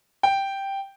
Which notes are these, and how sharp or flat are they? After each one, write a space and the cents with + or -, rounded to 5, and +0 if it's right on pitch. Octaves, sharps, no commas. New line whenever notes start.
G5 +0